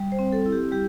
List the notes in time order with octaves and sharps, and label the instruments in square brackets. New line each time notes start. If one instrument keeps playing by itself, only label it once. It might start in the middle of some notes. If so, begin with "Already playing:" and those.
Already playing: [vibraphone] G3
C5
C4
A4
E4
G4
G3 G4